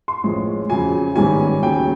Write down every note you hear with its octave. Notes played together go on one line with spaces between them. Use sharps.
C6
A1 A2 F3 G#3
F2 C#3 F#3 G#5
A1 G#2 D#3 G3 G#5
D#2 C#3 F#3 G5